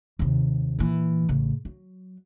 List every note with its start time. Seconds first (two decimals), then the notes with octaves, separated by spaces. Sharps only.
0.19 D#2 C3
0.79 A#2 E3
1.29 A1 C#3
1.65 F#3